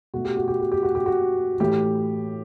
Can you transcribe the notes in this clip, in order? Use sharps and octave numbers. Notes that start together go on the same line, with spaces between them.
B2 A3 F#4
G4
F#4
G4
F#4
G4
F#4
G4
F#4
A2 E3 A3 G4